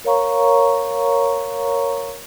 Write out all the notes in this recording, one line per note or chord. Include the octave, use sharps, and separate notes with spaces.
A#4 C#5 F5 A#5 C#6